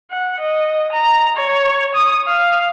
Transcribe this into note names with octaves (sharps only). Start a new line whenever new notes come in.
F#5
D#5
A#5
C#5
D#6
F5